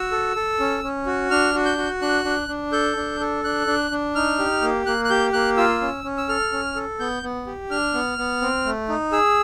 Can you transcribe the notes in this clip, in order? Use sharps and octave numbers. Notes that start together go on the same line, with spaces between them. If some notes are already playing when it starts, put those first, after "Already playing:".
Already playing: F#4 E6
A4
A4
C#4
C#4
F#4
D4 F6
F#4
G6
F#4
D4 F#6
D4
D4
A4 G6
D4
A4
D4 F#6
D4
D4
D#4 F6
G4
A#3
A#3 F#6
F#6
G4 G6
A#3 F#6
F4 E6
C#4
C#4
E6
A4 F6
C#4
A4
B3 G6
B3
G4
D4 F6
B3
B3
C4
A3
D#4
G#4 E6